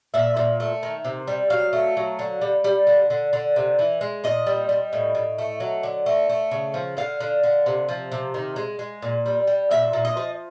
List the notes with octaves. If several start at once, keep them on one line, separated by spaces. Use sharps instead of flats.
A#2 E5
A#2
A3
D#3
C3
G3
F#3 F5
A3
F#3
D3
G3
G3
D3
D3
D3
C3
E3
G#3
A#2 D#5
G3
G3
A2
A2
A3
F#3
D3
A3
A3
C#3
F3
D3 F5
D3
D3
C3
F3
C3
D#3
G#3
G#3
A#2
G3
G3
A#2 E5
A#2
D#5
F3